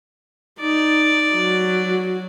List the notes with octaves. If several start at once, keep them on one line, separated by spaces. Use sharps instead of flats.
D#4 D5
F#3 F#4